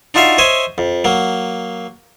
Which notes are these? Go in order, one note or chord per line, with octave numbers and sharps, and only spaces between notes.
D4 D#4 F4 F#4 E5 F5
C5 C#5 D#5 E5 G#5
F2
F#3 A#3